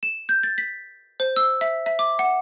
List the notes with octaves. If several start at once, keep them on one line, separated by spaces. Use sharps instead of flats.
E7
G6
A6
B6
C5
E6
E5
E5
D6
F#5